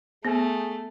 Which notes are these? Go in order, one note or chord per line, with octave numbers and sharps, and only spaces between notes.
A3 B3 G#4